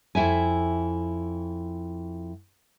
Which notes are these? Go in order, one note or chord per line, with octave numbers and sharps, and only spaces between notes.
F2 E4 E5 G#5